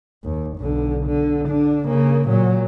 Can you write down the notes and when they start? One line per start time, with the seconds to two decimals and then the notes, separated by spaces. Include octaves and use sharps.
0.24 D#2
0.58 B1 D3
1.06 D3
1.46 D3 D4
1.88 C#3 A#3
2.29 A#2 F#3